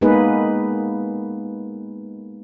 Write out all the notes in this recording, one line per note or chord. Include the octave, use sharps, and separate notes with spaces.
G#3 A#3 B3 D#4 G#4 B4